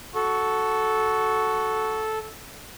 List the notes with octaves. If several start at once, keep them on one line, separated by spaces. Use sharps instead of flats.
F#4 A4